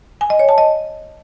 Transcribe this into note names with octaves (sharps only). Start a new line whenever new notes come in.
G#5
D#5
C#5
A5
D#5